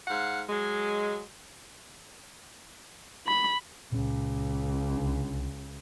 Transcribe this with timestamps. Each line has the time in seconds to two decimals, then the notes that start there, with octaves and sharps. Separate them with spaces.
0.08 G#2 F5 F#5
0.49 F#3 G#3
3.27 B5
3.92 C#2 A#2 C#4
4.96 C2 D4